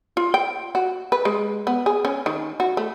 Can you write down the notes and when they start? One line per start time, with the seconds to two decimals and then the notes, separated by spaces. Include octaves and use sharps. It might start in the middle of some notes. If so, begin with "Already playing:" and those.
0.17 F4
0.34 G5
0.75 F#4
1.12 B4
1.25 G#3
1.67 B3
1.86 G#4
2.05 C#4
2.26 D#3
2.60 F#4
2.77 A3